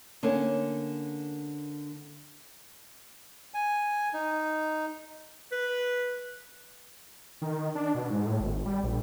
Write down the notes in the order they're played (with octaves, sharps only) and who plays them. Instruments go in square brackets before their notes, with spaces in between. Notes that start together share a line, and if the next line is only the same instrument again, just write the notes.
[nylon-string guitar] D3 A#3 C#4
[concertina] G#5
D#4
[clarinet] B4
[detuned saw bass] D#3
D4
B2
G#2
A2
G#1
G3
A#1